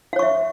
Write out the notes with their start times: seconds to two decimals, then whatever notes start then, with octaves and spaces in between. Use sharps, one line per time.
0.13 F5
0.16 C#5
0.19 C#6
0.23 E5